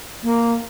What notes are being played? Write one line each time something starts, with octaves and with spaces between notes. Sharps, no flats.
A#3